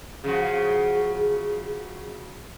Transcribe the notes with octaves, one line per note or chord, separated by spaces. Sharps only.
C#3 F3 F#4 G#4